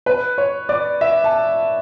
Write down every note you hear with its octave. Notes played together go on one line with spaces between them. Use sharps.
B4
C#5
D5
E5
A5